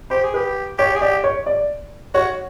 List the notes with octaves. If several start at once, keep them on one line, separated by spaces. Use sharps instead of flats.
G4 C5
G#4
G4 B4
G4 C#5
G#4
G4 D5
C#5
D5
F#4 C#5